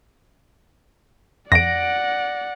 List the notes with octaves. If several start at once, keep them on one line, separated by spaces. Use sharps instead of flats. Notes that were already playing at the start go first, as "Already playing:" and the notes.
F2 D5 F#5 A#6 D7